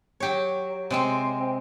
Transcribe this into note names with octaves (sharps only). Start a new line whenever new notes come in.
F#3 G4 C#5
C3 G#3 C4